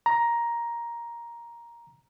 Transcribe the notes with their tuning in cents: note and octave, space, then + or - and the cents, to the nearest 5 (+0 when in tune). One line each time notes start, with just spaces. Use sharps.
A#5 +10